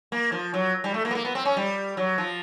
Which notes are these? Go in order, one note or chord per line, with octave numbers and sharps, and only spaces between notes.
A#3
F3
F#3
G3
A3
A#3
B3
A#3
B3
C4
C#4
G3
F#3
F3